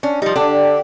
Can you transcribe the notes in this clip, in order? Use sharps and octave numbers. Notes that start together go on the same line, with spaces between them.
C#4 D4
F3 G3 D#4
D3 D4 G4